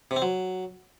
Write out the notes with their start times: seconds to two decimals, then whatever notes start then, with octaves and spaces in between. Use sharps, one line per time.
0.11 C3
0.16 C4
0.22 F#3